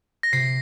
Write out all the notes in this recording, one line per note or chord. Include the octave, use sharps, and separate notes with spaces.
A#6
C3 C7